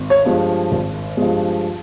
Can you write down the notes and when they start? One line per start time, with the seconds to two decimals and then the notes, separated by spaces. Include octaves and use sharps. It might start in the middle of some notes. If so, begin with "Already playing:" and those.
Already playing: G#1
0.10 C#5
0.25 G2 F3 G#3
0.71 G#1
1.17 G2 F3 G#3